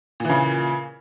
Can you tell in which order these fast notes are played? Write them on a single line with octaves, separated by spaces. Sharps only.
A#2 E3 C#3